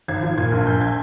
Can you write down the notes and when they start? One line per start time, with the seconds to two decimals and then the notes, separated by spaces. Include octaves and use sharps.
0.08 G#1 G#6
0.23 F3
0.37 A#2 G#6
0.52 A#1
0.67 A#1 G6
0.81 G#6